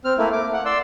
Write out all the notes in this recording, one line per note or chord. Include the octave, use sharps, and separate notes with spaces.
C4 F6
A3 A#3 E4
D6
F#5
D5 C6 E6